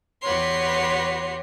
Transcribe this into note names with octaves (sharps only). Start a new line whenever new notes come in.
E2 F#4 G4 B4 C#5 C6